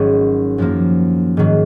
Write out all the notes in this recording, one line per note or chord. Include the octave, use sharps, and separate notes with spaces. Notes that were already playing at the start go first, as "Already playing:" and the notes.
Already playing: G#1 G#2 F#3 C#4
F#2 F3 A#3
G#2 D#3 F#3